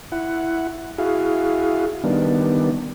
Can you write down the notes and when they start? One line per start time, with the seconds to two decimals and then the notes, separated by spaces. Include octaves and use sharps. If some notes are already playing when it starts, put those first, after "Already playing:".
0.12 E4 F#5
0.98 E4 F#4 G#4 F5
2.04 D#3 G3 B3 D4